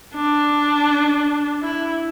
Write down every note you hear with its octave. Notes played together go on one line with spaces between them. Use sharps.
D4
E4